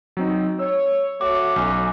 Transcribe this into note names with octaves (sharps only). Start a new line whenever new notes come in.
F#3 C4 D#4
C#5 E6
A3 F#4 C#5 D6
B1 C#4